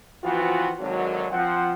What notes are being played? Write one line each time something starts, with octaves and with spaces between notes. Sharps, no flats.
E3 F3 B3 C4 F4 F#4
G#1 D3 F#3
F3 C4 F#5